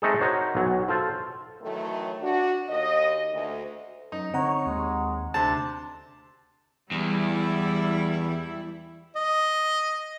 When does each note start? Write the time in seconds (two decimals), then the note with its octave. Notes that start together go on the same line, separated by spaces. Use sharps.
0.02 G#3 A3 C4 D#4 G#4 A4
0.21 D#4 F#4 A#4 C5 C#5
0.55 B1 F#3
0.88 F4 A4 C5
1.62 D#3 E3 F#3 A3
2.21 D4 F#4
2.69 D#2 D#5
3.33 D2
4.12 F#2 D#4
4.33 D3 C4 C#5 F#5 A#5
4.66 D#2 G#3
5.34 D2 C3 C4 D4 A5
6.91 E2 G3 E4
9.16 D#5